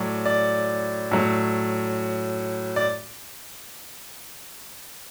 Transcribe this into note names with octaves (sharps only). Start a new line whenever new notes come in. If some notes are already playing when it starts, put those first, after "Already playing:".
Already playing: A2 F#3 D5
D5
A2 F#3
D5